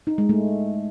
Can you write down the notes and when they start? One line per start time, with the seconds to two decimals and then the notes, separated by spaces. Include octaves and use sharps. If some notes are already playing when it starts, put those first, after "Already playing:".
0.07 D#4
0.18 G#3
0.29 A3